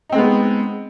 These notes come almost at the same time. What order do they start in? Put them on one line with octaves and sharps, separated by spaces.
D#4 C4 G#3 B3